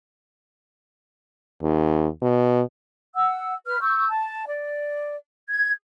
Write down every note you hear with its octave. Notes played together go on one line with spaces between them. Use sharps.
D#2
B2
F#5 E6
B4 F6
C#6 E6 G6
A5
D5
G#6